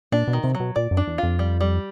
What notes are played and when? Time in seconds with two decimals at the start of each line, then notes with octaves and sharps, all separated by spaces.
0.12 A#2 D4
0.28 B2
0.33 D#3
0.44 C3
0.55 F#3
0.60 B2
0.76 A#2 D5
0.91 F#2
0.97 D4
1.07 E2
1.18 F2 F4
1.39 G3
1.61 G3